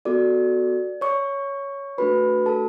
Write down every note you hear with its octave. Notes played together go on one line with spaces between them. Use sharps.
B3 F#4 A4 D5 D6
C#5 C#6
A3 D4 F#4 A4 B4 B5
A4 A5